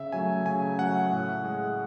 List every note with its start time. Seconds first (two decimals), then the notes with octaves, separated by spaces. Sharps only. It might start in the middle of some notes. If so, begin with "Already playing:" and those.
Already playing: C#3 E5
0.12 F#3 A3 G#5
0.46 C#3 G#5
0.79 F#3 A3 F#5
1.11 A2
1.44 G#3